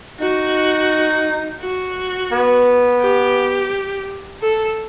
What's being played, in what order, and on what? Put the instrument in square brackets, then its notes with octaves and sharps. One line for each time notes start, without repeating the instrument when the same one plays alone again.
[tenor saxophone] D#4 [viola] F#4
[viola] F#4
[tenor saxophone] B3
[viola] G4
A4